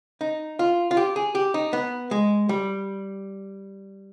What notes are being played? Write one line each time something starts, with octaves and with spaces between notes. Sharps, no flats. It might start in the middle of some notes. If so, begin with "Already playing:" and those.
D#4
F4
F4
G4
G#4
G4
D#4
B3
G#3
G3